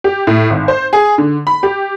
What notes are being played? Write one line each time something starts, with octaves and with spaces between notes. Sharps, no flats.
G4
A2
G#1
C5
G#4
D3
B5
G4